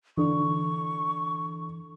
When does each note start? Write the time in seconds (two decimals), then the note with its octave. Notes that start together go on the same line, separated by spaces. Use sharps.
0.17 D3 E3 C#6